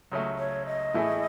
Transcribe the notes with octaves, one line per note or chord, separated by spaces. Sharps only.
C#2 C#3 F#3 A3
C#5
D#5
A2 E3 A3 E4 G#4